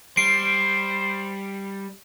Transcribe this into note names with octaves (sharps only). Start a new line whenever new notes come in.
G3 C5 C7 D7